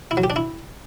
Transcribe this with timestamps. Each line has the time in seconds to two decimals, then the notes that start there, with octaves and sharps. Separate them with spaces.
0.11 E4
0.17 F#3
0.24 G4
0.30 D4
0.36 E4